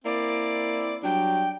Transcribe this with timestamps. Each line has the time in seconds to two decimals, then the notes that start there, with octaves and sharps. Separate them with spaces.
0.05 A#3 C4 E4 D5
1.03 F#3 G3 D4 G5